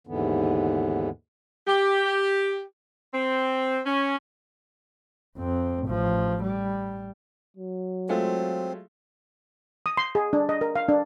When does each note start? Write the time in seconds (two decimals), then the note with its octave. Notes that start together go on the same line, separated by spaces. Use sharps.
0.07 D#2 G#2 D3 E3 B3
1.67 G4
3.13 C4
3.85 C#4
5.38 F2 C4
5.87 A1 F3
6.43 G3
7.57 F#3
8.09 G#3 A3 C4 F4
9.86 D#6
9.97 C6
10.15 G#4
10.33 D4
10.49 D#5
10.61 A#4
10.76 F5
10.89 D4